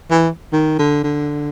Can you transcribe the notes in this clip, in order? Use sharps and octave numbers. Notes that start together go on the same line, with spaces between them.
E3
D#3
D3
D3